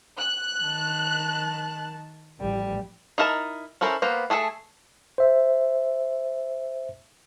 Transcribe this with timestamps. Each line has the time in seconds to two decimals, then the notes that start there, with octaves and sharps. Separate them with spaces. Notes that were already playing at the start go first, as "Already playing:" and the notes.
0.18 F#6
0.62 D#3 A5
2.40 A1 F3 G3
3.18 D#4 E4 A#4 A5 A#5
3.81 C#4 E4 A4 A#4 C5
4.02 A#3 B3 C5 A#5
4.30 A3 G#4 A4 B4 A5
5.18 C5 E5